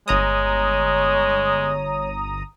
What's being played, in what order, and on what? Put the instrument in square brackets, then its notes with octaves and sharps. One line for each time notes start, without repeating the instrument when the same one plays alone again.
[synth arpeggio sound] G1 A#5 D#6 [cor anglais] G#3 [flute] C#5